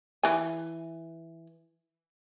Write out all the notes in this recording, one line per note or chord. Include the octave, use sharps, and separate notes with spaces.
E3 G#5